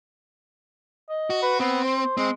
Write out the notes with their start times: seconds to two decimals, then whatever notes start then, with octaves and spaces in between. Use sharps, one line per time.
1.10 D#5
1.30 F#4
1.42 B4
1.60 B3 C4
1.84 C5
2.17 G#3 C4